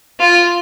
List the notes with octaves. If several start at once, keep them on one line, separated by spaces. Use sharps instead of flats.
F4